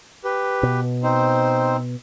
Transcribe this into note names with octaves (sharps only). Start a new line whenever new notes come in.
G4 B4
B2
C4 D#4 C5